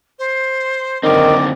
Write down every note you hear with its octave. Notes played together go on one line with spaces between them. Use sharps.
C5
F#2 D3 D#3 C4 D5